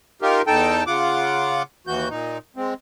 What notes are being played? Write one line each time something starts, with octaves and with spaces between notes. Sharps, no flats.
D#4 F4 G4 A#4
E2 D#4 A4 G5 A5
C#3 F4 F#5 D6
D#2 E3 F#4 G6
A#2 D#4
G#3 C4